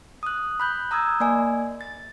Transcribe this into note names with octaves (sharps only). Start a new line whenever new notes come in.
D#6 F#6
B5 F#6 G6
A#5 D#6 E6 G6 G#6
A#3 D5 D#5 G#5
A6